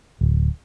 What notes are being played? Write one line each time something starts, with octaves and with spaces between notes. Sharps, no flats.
D1